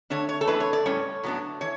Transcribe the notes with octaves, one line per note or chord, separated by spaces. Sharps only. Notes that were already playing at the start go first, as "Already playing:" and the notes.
D3 A3 D4 C#5
C#5
A4
F#2 E3 A3 D4 B4
C#5
D5
A2 G3 C#4 C#5
A2 F#3 B3 D4
E3 C#5